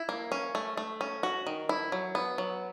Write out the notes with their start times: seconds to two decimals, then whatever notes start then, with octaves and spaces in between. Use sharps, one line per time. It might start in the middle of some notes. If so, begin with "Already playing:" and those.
Already playing: E4
0.09 A#3
0.32 C#4
0.55 A3
0.77 A3
1.01 C#4
1.23 F#4
1.47 D#3
1.69 E4
1.92 F#3
2.15 B3
2.38 F#3